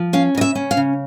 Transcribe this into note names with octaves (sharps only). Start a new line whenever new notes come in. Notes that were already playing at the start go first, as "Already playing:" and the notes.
Already playing: F3
C#4 F5
C#3 D#5
E5
C#4
F5
C#3